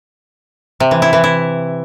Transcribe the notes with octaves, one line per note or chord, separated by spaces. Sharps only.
C3
E3
E4
E3
E4